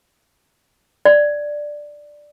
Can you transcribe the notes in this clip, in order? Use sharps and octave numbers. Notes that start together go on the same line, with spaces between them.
D5